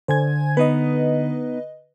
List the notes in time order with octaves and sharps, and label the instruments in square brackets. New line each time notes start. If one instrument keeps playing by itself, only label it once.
[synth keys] D3 [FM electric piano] C5 G#5 G#6
[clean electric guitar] B3 D#4 [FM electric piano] B4 D#5